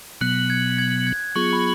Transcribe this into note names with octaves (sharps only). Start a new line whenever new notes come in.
B2 F#3 B3 F#6
G#6
G#6
G#6
F#3 B3 F4 G#4 C#6
B5